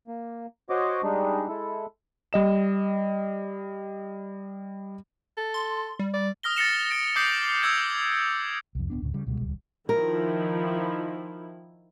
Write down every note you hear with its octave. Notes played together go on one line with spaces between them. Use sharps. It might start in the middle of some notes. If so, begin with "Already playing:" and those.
A#3
F#4 C5 C#5 D#5 D6
G3 G#3 D4 D#4
G#3 E4 A4
G3 D#5 E7
A4
C6
G3
D5
D#6 F6 A#6 G7
A6 A#6 C#7 E7
A#6 D7
D6 D#6 G6 C7 F#7
D#6 E6 G#6 C7
C2 F2
D1 B3 D4
D2 A2 C#3
C#3 G3
C#2 B2 G3 G#3
D#1 C#2 G3
D#3 F3 E4 A#4